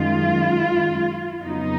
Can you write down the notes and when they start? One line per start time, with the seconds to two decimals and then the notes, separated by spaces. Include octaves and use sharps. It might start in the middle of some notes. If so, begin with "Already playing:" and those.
Already playing: F#2 D#3 G#3 F4
1.42 F2 C#3 F#3 B3 D#4